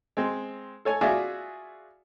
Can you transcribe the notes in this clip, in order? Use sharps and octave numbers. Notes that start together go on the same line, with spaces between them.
G#3 C4
A4 C#5 G#5
F4 F#4 G#4 D5 E5 G#5